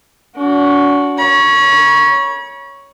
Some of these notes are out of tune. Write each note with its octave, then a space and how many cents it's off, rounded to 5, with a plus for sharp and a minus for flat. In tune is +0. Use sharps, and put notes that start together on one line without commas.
D4 -45 F#4 +0
C#5 +0 B5 -45